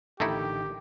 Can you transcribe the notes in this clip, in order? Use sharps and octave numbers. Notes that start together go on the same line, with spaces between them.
A1 D3 D#3 A3 D#4 E4 G4